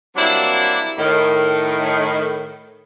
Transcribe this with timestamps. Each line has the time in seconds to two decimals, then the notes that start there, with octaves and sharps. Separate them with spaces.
0.16 F#3 G3 A#3 C4 D4 E4
0.98 A2 D#3